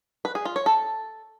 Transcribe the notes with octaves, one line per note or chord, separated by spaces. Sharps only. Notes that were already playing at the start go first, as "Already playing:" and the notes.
B4
G#4
F4
C#5
A4